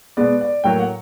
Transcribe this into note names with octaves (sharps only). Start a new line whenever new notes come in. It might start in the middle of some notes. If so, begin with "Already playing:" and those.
B2 G#3 B3 D5
D5
A2 F#3 A#3 G5
F#5